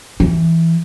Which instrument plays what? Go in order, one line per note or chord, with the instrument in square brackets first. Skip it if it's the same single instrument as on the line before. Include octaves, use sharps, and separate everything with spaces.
[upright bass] E3